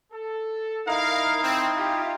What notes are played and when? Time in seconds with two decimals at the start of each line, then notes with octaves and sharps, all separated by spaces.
0.12 A4
0.87 D#4 E4 A#4 F5
1.43 C4
1.76 F4 G4